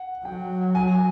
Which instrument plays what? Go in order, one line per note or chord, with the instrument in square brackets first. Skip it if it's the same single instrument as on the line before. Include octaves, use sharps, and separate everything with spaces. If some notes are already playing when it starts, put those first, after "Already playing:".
Already playing: [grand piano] F#5
[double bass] F#3 [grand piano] G5
[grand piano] G#5